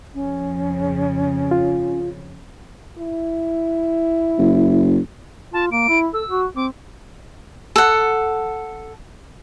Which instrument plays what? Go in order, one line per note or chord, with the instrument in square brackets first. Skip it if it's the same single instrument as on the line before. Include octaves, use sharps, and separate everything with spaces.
[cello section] F2 C#3 F3 [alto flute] C#4
[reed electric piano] F4
[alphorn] E4
[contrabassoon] F#1
[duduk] F4 [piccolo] A5
[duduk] A#3 [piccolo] D7
[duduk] E4
[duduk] A4 [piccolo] E6
[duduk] F#4
[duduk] C4 [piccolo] D6
[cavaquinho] A4 F#5